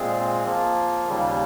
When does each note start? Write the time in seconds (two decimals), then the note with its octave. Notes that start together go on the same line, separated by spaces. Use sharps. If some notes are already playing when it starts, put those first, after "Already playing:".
Already playing: A#2 G#3 C4 F4 G#4
0.45 F3 A#3 F4
1.08 D#2 C#3 G3 A#3